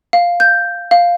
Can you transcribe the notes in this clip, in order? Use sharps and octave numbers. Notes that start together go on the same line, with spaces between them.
F5
G6
F5